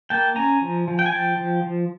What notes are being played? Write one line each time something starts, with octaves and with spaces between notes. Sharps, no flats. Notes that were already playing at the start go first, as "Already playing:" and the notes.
A#3 G5 A5
C#4 G#5 A#5
F3
F3
G5
G#5
F3 G5 A5
F3
F3